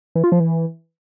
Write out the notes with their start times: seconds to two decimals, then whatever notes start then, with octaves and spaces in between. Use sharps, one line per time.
0.15 E3
0.24 F4
0.32 F3
0.40 E3